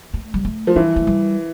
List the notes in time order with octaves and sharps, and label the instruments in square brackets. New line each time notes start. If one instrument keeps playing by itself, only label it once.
[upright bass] A3
G3
A3
[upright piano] F3
[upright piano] E3 [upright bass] G3
[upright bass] A3
G3